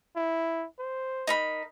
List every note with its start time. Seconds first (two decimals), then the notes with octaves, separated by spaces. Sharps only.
0.16 E4
0.79 C5
1.27 D#4 A#4 B5